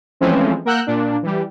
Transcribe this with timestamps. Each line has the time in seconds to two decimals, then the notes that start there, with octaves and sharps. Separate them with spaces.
0.21 E3 F3 G#3 A3 C4 C#4
0.65 A#3 A#4 F#5 E6 F#6 G6
0.87 A#2 D4
1.23 E3 G3